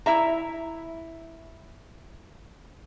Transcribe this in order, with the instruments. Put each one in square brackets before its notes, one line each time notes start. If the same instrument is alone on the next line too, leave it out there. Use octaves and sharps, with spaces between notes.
[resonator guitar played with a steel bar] E4 E5 A#5